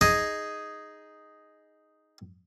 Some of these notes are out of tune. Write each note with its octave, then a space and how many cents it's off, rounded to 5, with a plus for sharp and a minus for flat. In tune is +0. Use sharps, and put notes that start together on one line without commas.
D#4 +0 G#4 +0 D#5 +0